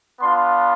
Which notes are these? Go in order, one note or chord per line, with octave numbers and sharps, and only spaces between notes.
B3 D4 F4 C6